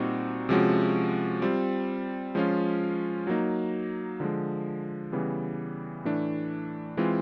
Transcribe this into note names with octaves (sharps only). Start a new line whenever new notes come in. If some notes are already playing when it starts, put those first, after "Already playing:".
Already playing: A#2 G3 C4 D#4 F#4
C3 F3 G#3 C#4 F#4
G3 C4 F4
F3 G#3 C#4 F4
F#3 A#3 D#4
D3 F3 G#3
C#3 E3 G3 B3
A2 E3 A3 D4
E3 G#3 C4 F4